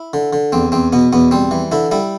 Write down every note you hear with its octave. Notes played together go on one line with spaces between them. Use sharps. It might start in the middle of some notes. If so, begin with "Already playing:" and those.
Already playing: E4
D3
D3
E2 C4
E2 C4
B2 B3
E2 B3
G3 C4
E3
D3 E4
G3 E4